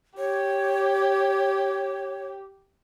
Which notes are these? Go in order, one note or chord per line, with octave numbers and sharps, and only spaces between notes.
G4 C#5